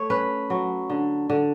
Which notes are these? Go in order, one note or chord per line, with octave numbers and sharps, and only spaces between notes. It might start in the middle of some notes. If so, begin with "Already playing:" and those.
Already playing: A3 C#5
C#4 B4
F#3
D3
D3